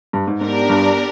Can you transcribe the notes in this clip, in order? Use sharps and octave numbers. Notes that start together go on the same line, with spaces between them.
G2
G#2
G#2 B3 D4 G4 A#4 D5
G2